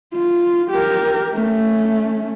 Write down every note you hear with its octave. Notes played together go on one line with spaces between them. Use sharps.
F4
G4 A#4
A3 C#4